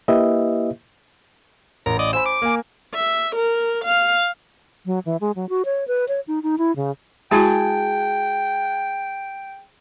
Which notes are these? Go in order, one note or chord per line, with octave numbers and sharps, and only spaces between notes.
A#3 E4 G4 B4 D#5 E5
A1 A#4
D5 D#5
C5 G#5 B5 E6
D6
A#3 G#5
E5
A#4
F5
F#3
E3
G#3
F#3
F#4
C#5
B4
C#5
D#4
D#4
E4
C#3
G#3 E4 F#4 G#4 G5 A5